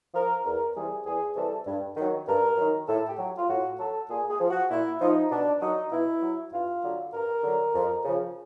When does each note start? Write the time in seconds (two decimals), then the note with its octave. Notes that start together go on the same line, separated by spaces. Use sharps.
0.15 F3 A#4
0.45 E2 A#4
0.76 C3 E3 G3 G#4
1.06 E2 G#4
1.36 C3 E3 G3 A4
1.67 G2
1.97 D#3 F#3
2.27 G2 A#4
2.58 D#3 F#3
2.88 A2 A4
3.09 G4
3.19 F#3
3.38 F4
3.49 A2 F#4
3.79 F#3 A4
4.10 A#2 G#4
4.30 G#4
4.40 F3
4.50 F#4
4.70 A#2 E4
5.01 F3 D#4
5.31 B2 D4
5.62 F#3 D#4
5.92 B2 E4
6.23 F#3
6.53 G2 F4
6.84 D3 F#3
7.14 G2 A#4
7.44 D3 F#3
7.75 F2
8.05 C#3 F3